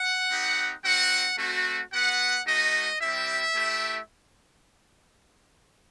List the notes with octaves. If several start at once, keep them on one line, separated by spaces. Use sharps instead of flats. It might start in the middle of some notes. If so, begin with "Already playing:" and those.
Already playing: F#5
C4 D#4 G4
C4 D#4 F#4 F#5
A3 C4 F#4
B3 F#4 F#5
A3 D#4 F#4 D#5
G3 C4 E4 G4 E5
A3 E4 G4